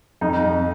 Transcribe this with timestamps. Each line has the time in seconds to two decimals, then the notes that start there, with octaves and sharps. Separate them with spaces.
0.21 F2 D#4
0.44 F2